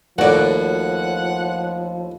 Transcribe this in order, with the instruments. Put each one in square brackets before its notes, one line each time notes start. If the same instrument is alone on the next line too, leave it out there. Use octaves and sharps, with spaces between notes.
[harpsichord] D#2 A2 [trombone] F3 [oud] F#4 D5 [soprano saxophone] F#5